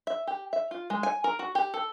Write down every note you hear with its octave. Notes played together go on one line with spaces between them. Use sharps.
E5
G4
E5
F4
G#3
G#5
A#4
F#4
G4
A4